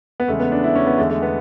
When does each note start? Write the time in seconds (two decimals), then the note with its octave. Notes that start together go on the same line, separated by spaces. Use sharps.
0.20 B3
0.28 E2 C#3 G#3 A3
0.40 B3
0.52 D4
0.64 E4
0.76 C#4
0.87 B3
0.98 E2 D3 G#3 A3
1.10 A3
1.22 B3